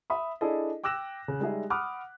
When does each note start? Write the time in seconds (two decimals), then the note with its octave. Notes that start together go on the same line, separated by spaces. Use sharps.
0.10 E5 B5 D#6
0.41 D4 E4 G#4 A4 D5 D#5
0.84 G5 D6 E6 F#6 A#6 E7
1.28 C#3
1.40 G3 G#3 D#4 G#4 E5
1.70 F#5 B5 D6 D#6 F6 F#6